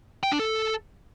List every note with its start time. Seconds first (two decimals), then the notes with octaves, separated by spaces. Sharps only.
0.24 G5
0.32 D4
0.40 A4